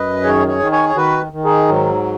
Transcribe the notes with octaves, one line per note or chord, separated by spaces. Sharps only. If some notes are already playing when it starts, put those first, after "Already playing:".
Already playing: F#2 B4 D#5
D#3 G#4 C#5
G#4 C#5
D#3
G#4 C#5
C#5
D#3 F#4 B4
D#3
D#4 G#4
G#2 F#3